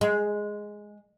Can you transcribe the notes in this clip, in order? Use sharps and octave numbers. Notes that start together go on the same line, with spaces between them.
G#3